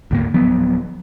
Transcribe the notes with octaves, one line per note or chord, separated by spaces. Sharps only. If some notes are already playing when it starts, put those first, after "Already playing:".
D2 G#2 A#3
D1 F3 F#3 B3